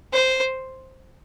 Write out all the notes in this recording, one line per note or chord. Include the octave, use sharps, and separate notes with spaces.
C5